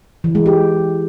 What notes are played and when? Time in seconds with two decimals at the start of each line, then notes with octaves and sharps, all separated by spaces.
0.24 E3
0.35 G#3
0.46 G4